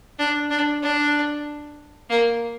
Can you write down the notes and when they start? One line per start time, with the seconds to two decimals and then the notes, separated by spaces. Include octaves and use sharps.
0.19 D4
0.50 D4
0.82 D4
2.09 A#3